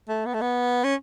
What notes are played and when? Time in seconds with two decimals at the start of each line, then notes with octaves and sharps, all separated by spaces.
0.08 A3
0.26 B3
0.34 A3
0.41 B3
0.84 C#4